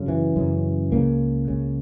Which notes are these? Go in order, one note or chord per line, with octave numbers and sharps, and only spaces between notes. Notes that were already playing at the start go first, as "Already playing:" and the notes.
Already playing: F#2 C#3
E3
F#2 C#3
C#2 C#3 A#3
C#2 C#3